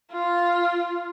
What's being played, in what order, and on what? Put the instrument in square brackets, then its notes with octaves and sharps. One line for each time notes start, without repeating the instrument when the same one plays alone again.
[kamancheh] F4